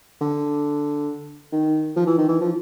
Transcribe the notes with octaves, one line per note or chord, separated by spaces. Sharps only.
D3
D#3
F3
E3
D#3
E3
F3